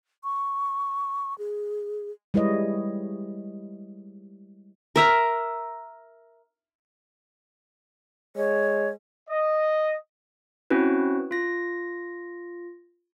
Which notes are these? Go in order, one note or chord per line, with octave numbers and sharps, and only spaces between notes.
C#6
G#4
G3 G#3 E4 B4 C#5 D#5
A#4 E5 A#5
G#3 C#5
D#5
C4 C#4 E4 F#4 B4
F4 A#6